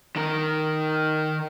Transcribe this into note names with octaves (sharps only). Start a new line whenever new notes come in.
D#3 A#4